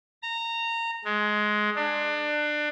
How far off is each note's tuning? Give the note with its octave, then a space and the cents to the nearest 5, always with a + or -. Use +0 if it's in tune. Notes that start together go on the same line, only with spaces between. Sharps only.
A#5 -20
G#3 +15
D4 +25